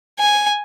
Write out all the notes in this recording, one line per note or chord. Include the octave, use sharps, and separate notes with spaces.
G#5